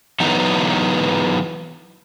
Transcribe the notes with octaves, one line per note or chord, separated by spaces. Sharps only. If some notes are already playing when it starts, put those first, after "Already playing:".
E3 F#3 B3 D#4